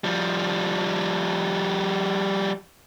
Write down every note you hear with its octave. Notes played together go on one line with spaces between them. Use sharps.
F3 G3